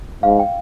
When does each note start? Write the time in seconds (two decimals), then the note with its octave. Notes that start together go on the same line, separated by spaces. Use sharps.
0.23 G#2 F5
0.40 G5